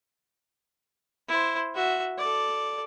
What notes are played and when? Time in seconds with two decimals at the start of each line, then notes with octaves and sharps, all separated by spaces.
1.29 E4 C5
1.75 F#4 E5
2.18 A4 D5